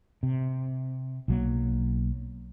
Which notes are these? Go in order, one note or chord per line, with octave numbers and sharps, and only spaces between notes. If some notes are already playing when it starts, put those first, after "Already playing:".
C3
B1 F#3 A#3